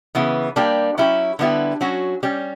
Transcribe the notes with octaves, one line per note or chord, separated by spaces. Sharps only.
C#3 E3 B3
G3 A#3 D4 G4
F#3 C#4 E4 G4
D3 G3 B3 E4 G4
F#3 C#4 F#4
G3 C#4 G4